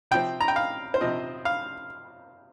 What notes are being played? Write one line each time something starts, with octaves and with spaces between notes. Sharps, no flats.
C3 F3 C4 G5
A#5
G5
F5
C5
C3 F3 C4 D#5
F5